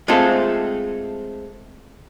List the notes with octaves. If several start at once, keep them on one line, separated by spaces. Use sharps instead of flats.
G#3 A3 C4 F4 A4